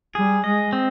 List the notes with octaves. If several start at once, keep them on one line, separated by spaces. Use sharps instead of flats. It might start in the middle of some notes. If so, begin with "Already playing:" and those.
G3 G#4
G#3 D#5
C4